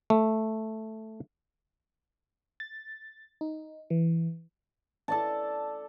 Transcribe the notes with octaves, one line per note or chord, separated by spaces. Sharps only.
A3
A6
D#4
E3
A4 D5 A5